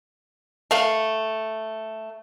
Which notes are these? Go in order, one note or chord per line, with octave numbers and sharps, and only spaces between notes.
A3 F5